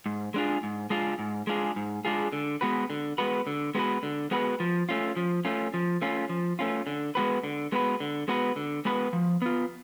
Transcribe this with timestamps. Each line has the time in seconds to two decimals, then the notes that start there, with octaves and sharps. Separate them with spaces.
0.06 G#2
0.34 G#3 D4 F4 G#4
0.63 G#2
0.90 G#3 D4 F4 G#4
1.19 G#2
1.47 G#3 D4 F4 G#4
1.76 G#2
2.05 G#3 D4 F4 G#4
2.33 D3
2.61 G#3 B3 F#4 B4
2.90 D3
3.18 G#3 B3 F#4 B4
3.47 D3
3.75 G#3 B3 F#4 B4
4.03 D3
4.31 G#3 B3 F#4 B4
4.60 F3
4.89 A3 C#4 F4
5.16 F3
5.45 A3 C#4 F4
5.74 F3
6.02 A3 C#4 F4
6.29 F3
6.59 A3 C#4 F4
6.87 D3
7.15 G#3 B3 F#4 B4
7.44 D3
7.72 G#3 B3 F#4 B4
8.00 D3
8.28 G#3 B3 F#4 B4
8.56 D3
8.85 G#3 B3 F#4 B4
9.13 F3
9.42 B3 F4